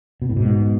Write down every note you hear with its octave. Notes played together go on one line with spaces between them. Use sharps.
B2
A2
G#2 B2